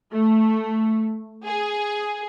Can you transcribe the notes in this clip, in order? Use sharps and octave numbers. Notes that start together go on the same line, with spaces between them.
A3
G#4